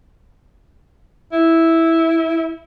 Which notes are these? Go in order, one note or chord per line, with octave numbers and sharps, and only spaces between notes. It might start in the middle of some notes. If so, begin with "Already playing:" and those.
E4